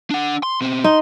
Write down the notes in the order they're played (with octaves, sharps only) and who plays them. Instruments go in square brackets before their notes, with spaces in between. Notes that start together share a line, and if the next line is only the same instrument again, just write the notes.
[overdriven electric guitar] D4 F#5
C6
B2 C4
[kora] D#4 [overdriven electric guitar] C6